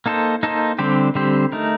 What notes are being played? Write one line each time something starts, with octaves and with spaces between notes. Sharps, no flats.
A#3 D#4 A4 C5
A#3 D#4 A4 C5
D3 G3 C4 G4 C5
D3 G3 C4 G4 C5
A3 D#4 A#4